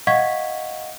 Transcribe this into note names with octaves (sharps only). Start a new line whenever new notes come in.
D#5 F5 F#5 C#6 G#6 B6